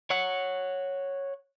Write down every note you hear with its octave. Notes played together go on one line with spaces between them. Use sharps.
C#5 F#5